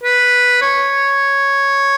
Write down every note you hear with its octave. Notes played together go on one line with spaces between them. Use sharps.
B4
C#5